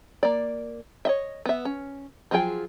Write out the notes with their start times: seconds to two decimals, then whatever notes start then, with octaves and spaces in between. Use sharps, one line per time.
0.23 A#3 D5
1.05 C#5 D#5 E5
1.46 B3 E5
1.65 C#4
2.31 F3 F#3 F4 G#4 G5